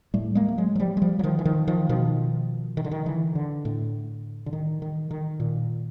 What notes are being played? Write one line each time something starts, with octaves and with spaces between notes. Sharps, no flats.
A2 G3 A3
G#3 A#3
A3
F#3 G#3
F#3
F3 G3
G#3
F3 G3
F#3
D#3 F3
E3
D#3 F3
D#3 F3
B2 D#3 F3
D#3
D3
D#3
D3 E3
D3
A2
D3
D#3
D#3
D#3
A#2